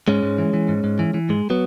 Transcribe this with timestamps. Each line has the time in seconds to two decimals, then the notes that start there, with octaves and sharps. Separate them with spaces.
0.08 G#2 G#3 C#4
0.23 G#2
0.38 E3
0.54 E3
0.68 G#2
0.84 G#2
0.99 E3
1.14 E3
1.29 G#2 G#3
1.50 F#3 B3